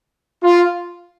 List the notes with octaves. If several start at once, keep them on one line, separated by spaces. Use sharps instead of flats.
F4